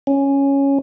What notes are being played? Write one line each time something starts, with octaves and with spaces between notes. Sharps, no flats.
C#4